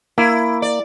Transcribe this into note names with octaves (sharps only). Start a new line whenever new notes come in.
A#3 E4
D5